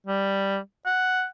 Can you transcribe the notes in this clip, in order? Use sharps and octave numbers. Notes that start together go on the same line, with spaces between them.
G3
F#5